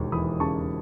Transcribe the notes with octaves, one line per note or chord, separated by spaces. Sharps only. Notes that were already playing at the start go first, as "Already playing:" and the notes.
Already playing: E1 D#2 C#6
E3 B5 D#6
C#3 A5 C#6